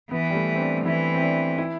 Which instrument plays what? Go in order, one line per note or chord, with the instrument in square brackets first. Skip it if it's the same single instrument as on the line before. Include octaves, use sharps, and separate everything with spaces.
[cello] E3 [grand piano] B3
[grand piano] G3
A3
C4
D4
[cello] E3 [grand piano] E4
[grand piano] C4
D4
E4